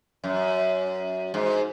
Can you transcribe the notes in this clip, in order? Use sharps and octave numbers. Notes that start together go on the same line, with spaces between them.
F#2
G#2